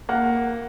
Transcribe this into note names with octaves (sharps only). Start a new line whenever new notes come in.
A#3 F#5